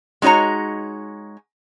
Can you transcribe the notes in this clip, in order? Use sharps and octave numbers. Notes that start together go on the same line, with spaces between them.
G#3 D#4 F#4 C#5 A#5